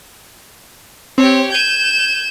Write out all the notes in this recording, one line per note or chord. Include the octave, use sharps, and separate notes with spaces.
C4 G4 C#5
G6 G#6 D#7 E7